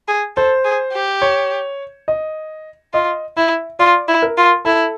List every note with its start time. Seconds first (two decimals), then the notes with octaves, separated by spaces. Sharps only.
0.08 G#4
0.36 A4 C5
0.65 G#4
0.93 G4
1.22 C#5
2.08 D#5
2.93 F4 D#5
3.37 E4 E5
3.79 F4 D5
4.08 E4
4.22 A#4
4.37 F4
4.65 E4 A4